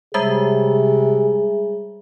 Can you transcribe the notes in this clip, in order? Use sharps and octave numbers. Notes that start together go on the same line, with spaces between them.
C3 G3 G#3 G#4 E5